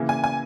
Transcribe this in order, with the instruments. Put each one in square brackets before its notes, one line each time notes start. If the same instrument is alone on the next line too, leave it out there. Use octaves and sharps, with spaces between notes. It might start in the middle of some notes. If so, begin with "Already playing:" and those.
Already playing: [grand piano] C#3 E3 A#3 E4
[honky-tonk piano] G#5
G#5